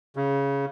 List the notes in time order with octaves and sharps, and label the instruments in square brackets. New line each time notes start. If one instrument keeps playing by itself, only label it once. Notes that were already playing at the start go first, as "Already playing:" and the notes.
[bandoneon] C#3